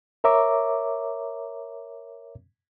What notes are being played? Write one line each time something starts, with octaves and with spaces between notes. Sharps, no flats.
A#4 C#5 E5 A#5 D6